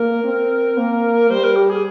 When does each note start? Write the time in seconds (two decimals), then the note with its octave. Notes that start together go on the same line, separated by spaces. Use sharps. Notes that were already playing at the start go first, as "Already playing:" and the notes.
Already playing: A#3 A#4
0.24 C4
0.78 A#3
1.30 G3 C5
1.44 A#4
1.56 G4
1.70 G#4